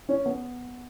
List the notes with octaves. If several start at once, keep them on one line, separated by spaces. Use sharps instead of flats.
C#4
B3